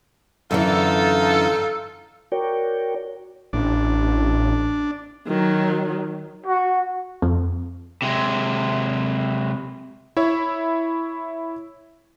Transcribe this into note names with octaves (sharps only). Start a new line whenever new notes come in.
F#2 D3 E3 D#4 F4 A4
F#4 A#4 C#5 D5 G5
A1 D4
D#3 F#3
F#4
F2
C3 G#3
E4 C#5 E5